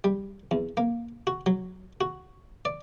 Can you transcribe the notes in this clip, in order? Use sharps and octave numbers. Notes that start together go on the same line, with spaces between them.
G3
E2
A#3
F#4
F#3
F#4
D5